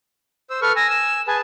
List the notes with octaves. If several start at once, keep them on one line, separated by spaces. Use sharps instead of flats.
C5 E6
A4 B4 C#6 F6
G#5 E6 A#6
E7
G#4 B4 G#5 A5